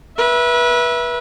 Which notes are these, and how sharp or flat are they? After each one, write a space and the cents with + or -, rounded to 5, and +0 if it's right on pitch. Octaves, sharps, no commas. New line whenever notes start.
B4 -30 E5 +0